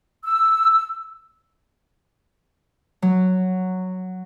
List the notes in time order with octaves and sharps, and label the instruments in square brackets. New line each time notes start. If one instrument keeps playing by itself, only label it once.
[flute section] E6
[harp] F#3